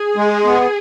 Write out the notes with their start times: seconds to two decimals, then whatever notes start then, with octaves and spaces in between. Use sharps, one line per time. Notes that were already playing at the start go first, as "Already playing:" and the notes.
Already playing: G#4
0.16 G#3
0.44 B3